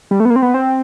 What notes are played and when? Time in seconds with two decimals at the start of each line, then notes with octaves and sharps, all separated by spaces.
0.11 G3
0.20 A3
0.25 B3
0.30 A#3
0.36 C4
0.42 B3
0.54 C4